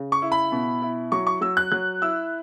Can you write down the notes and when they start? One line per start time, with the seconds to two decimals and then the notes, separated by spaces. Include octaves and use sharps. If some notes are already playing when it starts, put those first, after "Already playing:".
Already playing: C#3
0.12 C#6
0.22 E4
0.32 B5
0.52 B2
0.82 E4
1.12 F#3 C#6
1.27 C#6
1.41 F#3 E6
1.57 F#6
1.72 F#3 F#6
2.02 E4 E6